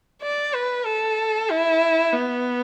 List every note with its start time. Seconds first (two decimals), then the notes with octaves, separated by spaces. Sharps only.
0.22 D5
0.54 B4
0.85 A4
1.49 E4
2.13 B3